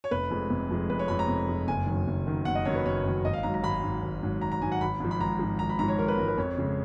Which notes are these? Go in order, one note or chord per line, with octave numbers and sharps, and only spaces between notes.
C#5
F1 B4
F2 F3 G#3
F1
F2 F3 G#3
F1 B4
C#5
F2 F3 G#3 B5
A#5
F1
F2 F3 G#3
F#1 G#5
F#2 D#3 F#3
F#1
F#2 D#3 F#3
F#1 F#5
D#5
F#2 D#3 F#3 C#5
B4
F#1 C#5
F#2 D#3 F#3
G#1 D#5
F5
G#2 F#3 A#5
A#5
G#1 B5
G#2 F#3
G#1
G#2 F#3
G#1 A#5
A#5
G#2 F#3 G#5
F#5
G#1 B5
G#2 F3
B5
G#1 A#5
G#2 F3
G#1 A#5
B5
G#2 F3 A#5
C#5
G#1 A#4
B4
G#2 F3 A#4
B4
F2 C#5
C#3 F3 G#3